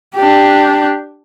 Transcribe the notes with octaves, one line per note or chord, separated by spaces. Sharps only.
D4 G4